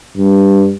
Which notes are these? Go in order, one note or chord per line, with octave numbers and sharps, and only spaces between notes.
G2